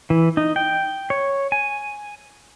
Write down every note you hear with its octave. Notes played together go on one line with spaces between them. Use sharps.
E3
D#4
G5
C#5
G#5